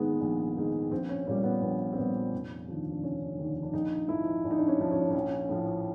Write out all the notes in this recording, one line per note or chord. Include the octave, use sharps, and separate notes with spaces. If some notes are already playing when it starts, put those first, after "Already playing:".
Already playing: A#1 G#2 D#3 G#3 A#3 B3
A#1
G#2 D#3 G#3
A#1 C4
C#4
A#2 G3 C#4
B3
A#1 B3
C4
A#2 G3 B3
F1 C#4
D#2 D3 F3
D4
F1 C#4
D#2 D3 F3
D4
A#1 D#4
G#2 F3 E4
A#1 D4
D#4
D4
C#4
G#2 F3
C#4
D4
A#1 C#4
A2 F3